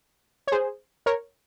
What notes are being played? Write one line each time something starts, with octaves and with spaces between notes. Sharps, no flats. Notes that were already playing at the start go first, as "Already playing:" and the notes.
C#5
G#4 C5
A#4 C#5